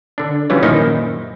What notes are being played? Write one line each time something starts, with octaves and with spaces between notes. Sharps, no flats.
D3 D4
E3 F#3 G3 C#4 E4 F4
F#2 A#2 D#3 F3 D#4 E4